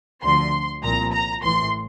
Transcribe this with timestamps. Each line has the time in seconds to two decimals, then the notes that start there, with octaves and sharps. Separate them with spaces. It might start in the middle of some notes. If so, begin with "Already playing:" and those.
0.22 D2 D3 F3 C6
0.82 C2 A#2 F3 A#5
1.12 A#5
1.42 A1 A2 E3 C6